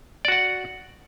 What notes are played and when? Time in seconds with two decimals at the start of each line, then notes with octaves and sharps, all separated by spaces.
0.25 D5
0.28 F#4
0.32 F#5